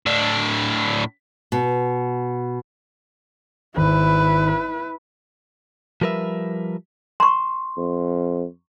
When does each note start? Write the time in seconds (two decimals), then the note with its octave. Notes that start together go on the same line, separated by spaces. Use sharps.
0.06 A2 D4
1.52 B2
3.77 G#1 E4 B4
6.02 F3 G3 A#4 B4 E5
7.20 A#5 C6 C#6
7.77 F2